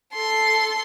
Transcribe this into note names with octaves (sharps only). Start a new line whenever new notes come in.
A4 C6